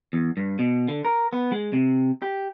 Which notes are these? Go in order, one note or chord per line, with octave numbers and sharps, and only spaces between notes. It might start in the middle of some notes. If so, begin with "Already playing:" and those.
E2
G2
B2
D3
A#4
B3
G#3
C3
G4